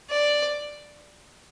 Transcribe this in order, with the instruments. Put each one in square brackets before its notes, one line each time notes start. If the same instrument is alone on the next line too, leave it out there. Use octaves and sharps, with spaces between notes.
[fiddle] D5